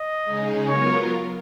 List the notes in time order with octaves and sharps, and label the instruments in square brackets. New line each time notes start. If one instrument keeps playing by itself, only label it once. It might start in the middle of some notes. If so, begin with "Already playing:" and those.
Already playing: [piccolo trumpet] D#5
[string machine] C#3 G#3 D#4 G#4
[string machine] F#3 B3 F4 A#4 [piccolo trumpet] C#5